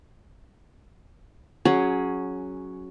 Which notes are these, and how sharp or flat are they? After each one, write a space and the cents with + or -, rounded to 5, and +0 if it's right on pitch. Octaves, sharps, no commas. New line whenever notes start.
F#3 -5 C#4 +0 G#4 +15